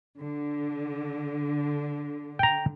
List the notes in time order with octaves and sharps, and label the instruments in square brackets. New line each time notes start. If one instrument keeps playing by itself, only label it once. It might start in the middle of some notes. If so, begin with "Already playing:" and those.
[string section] D3
[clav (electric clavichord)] G5 A#5